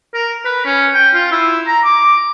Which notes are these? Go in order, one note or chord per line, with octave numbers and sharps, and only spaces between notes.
A#4
B4
C#4
G5
F4
E4
A#5
D6